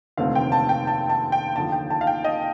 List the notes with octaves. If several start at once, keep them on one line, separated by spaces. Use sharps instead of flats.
F1 D#2 D3 A3 C4 F5
G5
A5
G5
A5
A5
G5
D#2 D3 F3 A5
G5
A5
F5
G5
D#5